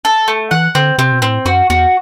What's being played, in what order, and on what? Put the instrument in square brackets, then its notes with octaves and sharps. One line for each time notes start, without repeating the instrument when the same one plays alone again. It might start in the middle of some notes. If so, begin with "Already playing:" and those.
[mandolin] A4
A3
[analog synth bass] E3 [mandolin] F#5
[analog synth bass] D3 [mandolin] C4
[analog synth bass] C3 [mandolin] C4
[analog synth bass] B2
[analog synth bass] A2 [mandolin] C4
[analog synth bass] F#2 [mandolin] F#4
[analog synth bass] E2 [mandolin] F#4